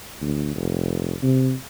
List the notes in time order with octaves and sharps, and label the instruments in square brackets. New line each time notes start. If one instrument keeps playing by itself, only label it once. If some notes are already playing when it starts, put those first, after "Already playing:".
[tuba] D2
F1
C3